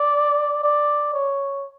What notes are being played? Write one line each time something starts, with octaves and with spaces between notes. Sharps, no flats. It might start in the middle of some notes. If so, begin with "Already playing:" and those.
Already playing: D5
D5
C#5